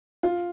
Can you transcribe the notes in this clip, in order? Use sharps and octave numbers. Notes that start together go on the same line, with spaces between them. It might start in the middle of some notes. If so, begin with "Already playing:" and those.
F4